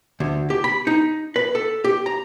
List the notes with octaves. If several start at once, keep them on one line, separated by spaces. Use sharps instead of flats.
D2
G4
B5
D#4
B4
A4
G4
A#5